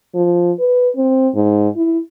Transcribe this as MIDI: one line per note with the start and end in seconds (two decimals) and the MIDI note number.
0.14 0.52 53
0.59 0.89 71
0.96 1.29 60
1.35 1.68 44
1.76 1.99 64